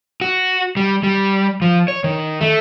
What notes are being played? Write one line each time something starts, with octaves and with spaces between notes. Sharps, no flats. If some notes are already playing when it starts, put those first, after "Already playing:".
F#4
G3
G3
F3
C#5
D#3
A3